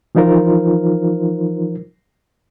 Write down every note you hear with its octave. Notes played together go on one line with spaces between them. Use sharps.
E3 F3 D#4 F4 A#4 C5